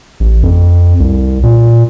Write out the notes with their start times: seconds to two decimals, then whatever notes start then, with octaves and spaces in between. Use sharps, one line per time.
0.20 A1
0.43 F2
1.00 C2
1.43 A#2